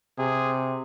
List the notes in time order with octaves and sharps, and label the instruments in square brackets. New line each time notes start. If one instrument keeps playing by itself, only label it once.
[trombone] C3 [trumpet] G#4